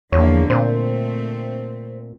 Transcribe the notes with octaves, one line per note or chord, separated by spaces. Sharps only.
E2 D3 F3 A#3 C#5
A#2 A3 C4 C5